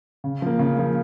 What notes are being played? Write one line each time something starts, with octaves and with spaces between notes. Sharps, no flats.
C#3
F3 A#3
C#3
F3 A#3